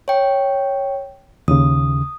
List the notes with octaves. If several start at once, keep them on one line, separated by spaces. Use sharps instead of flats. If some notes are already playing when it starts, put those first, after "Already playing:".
C#5 G5
D#2 C#3 D#6